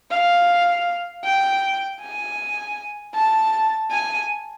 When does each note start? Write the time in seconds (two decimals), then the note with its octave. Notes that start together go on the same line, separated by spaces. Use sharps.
0.11 F5
1.24 G5
2.01 G#5
3.15 A5
3.91 G#5